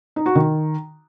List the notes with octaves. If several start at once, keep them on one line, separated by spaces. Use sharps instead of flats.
D#4
F#4
D#3